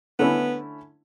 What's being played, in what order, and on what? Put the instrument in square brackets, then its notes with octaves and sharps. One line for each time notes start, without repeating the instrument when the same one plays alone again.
[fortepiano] D3 A3 C#4 E4 [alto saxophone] B3